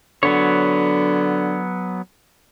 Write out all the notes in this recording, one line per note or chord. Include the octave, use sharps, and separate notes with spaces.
D3 F#3 B3 C#5